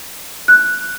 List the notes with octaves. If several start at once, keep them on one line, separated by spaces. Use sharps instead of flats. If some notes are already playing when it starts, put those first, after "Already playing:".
F#6